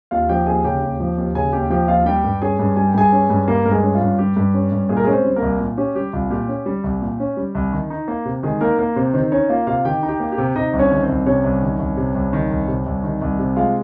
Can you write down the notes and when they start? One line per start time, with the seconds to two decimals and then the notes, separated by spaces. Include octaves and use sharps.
0.11 D#2 F4 F5
0.29 F3 G4 G5
0.47 D#2 G#4 G#5
0.64 C#3 G4 G5
0.82 D#2
1.00 F3
1.18 D#2
1.35 C#3 G#4 G#5
1.53 D#2 G4 G5
1.70 F3 G4 G5
1.88 D#2 F4 F5
2.06 G3 G4 G5
2.24 G2
2.42 C#4 G#4 G#5
2.59 G2
2.76 G3 G#5
2.87 G5
2.94 G2 G#4 G#5
3.12 C#4
3.30 G2
3.48 G3 A#3 A#4
3.65 G2 A#4
3.71 G#3 G#4
3.83 C#4
3.95 F4
4.01 G2
4.19 G3 G4
4.36 G2
4.54 C#4
4.72 G2
4.89 A#2 G#4
4.97 A#4
5.04 G#3 C#4 G#4
5.13 C4 C5
5.25 G3
5.36 A#3 A#4
5.42 C2
5.60 A#2
5.77 C#4 G4
5.95 G3 G4
6.13 C2 F4
6.30 A#2 G4
6.48 C#4
6.66 G3
6.84 C2
7.02 A#2
7.20 C#4
7.37 G3
7.55 C2
7.72 D#3
7.90 D#4
8.08 A#3
8.25 C3
8.43 D#3 G#3 G#4
8.61 A#3 D#4 A#4
8.79 A#3 A#4
8.96 C3 C4 C5
9.14 D#3 C4 C5
9.32 C#4 D#4 C#5
9.49 A#3 F4 F5
9.67 C3 F4 F5
9.85 D#3 G4 G5
10.03 D#4
10.08 G4 G5
10.20 A#3
10.32 G4 G5
10.38 C3
10.55 C3 D#4 D#5
10.73 C2
10.79 C#4 C#5
10.91 D#3
11.03 C4 C5
11.09 C2
11.26 C3 C#4 C#5
11.44 C2
11.62 D#3
11.80 C2
11.97 C3
12.15 C2
12.33 D#3
12.50 C2
12.68 C3
12.86 C2
13.04 D#3
13.21 C2
13.39 C3
13.56 G#3 F4 F5